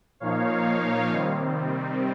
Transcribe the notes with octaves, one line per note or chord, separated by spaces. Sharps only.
A#2 F3 A#3 D#4 C#5 F5
C#5 F5
C3 D#3 G3 C4